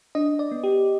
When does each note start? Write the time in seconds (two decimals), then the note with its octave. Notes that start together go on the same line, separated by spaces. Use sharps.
0.15 D4 D#5
0.39 D5
0.51 B3
0.64 G4